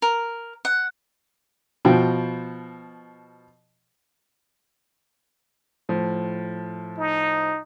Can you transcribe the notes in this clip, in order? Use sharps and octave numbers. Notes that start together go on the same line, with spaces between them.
A#4
F#5
B2 F3 G5
A2 F3
D#4